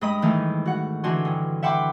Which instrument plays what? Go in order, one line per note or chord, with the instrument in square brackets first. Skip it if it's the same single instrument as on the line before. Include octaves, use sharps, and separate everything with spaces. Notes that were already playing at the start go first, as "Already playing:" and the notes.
[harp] G2 G#3 D#5 B5 D#6
G#2 D#3 E3 G3 A3
F#4 F#5
D3 E3 D4 F#4 G#5 C6
G2
E5 F#5 G5 B5 C6 D6